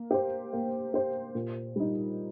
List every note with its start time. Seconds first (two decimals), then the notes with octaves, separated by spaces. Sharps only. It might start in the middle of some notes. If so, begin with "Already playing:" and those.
Already playing: A#3
0.11 G4 C5
0.53 A#3
0.94 G4 C5
1.35 A#2
1.76 G3 D#4